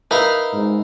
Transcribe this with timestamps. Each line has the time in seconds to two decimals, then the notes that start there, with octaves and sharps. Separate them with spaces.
0.11 D#4 E4 A#4 B4 F5
0.53 G#2